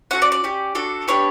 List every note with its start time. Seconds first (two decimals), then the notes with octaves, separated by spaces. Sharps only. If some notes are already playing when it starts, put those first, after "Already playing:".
0.11 C#4 F#4 A4 F#5
0.22 D5
0.32 D5
0.44 C#4 G4
0.75 D4 F#4 A4
1.08 B3 D4 G4 C#5